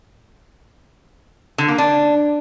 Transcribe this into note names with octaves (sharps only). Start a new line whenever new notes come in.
D3
A#3
D4